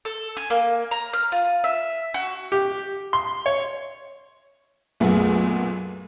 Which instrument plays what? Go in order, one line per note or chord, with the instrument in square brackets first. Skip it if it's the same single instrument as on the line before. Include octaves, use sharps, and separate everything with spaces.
[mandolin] A4
G#5
A#3
A#5
F6
F4
E5
F#4
[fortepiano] G4
C6
C#5
[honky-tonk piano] B1 F#2 A#2 A3 B3 G#4